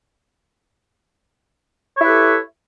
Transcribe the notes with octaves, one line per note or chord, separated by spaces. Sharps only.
E4 G4 A4 B4 C#5